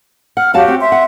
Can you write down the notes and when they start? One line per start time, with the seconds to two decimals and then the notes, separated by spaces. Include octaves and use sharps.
0.37 F#5 F6
0.54 F#2 F#4 G4 F5 F#5 A5
0.68 C4
0.81 E5 C6
0.92 F#5